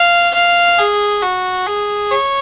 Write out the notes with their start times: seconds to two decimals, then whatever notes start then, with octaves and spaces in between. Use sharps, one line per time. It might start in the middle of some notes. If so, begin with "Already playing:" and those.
Already playing: F5
0.34 F5
0.79 G#4
1.22 F#4
1.66 G#4
2.11 C#5